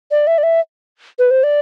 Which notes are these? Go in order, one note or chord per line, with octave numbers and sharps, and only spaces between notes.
D5
E5
D5
E5
B4
C5
D5